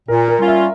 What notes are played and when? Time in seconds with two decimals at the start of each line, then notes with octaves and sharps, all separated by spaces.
0.08 A#2 A#4
0.28 A#4
0.38 G3 C#4 F4
0.48 E5